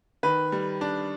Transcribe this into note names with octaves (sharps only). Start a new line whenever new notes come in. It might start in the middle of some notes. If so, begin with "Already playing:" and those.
D#3 B4
G3
D4